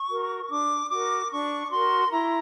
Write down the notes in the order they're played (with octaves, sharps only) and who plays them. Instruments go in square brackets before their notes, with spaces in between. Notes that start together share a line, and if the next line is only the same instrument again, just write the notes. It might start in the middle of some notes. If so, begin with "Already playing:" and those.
Already playing: [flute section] C#6
F#4 A#4
D4 D6
F#4 A#4 D6
D4 C#6
F#4 A#4 C6
E4 A#5